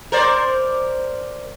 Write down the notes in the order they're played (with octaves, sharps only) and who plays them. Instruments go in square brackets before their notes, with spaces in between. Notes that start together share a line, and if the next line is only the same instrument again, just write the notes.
[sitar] A#4 C5 D5